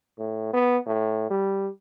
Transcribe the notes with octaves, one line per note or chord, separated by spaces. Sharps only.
A2
B3
A2
G3